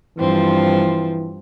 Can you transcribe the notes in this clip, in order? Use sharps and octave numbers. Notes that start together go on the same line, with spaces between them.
G2 E3 F3 C4